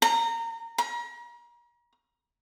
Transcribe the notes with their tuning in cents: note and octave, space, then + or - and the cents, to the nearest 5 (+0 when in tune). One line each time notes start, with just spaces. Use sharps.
A#5 -20
A#5 +40